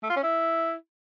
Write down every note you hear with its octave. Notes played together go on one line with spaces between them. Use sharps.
A3
F4
C#4
E4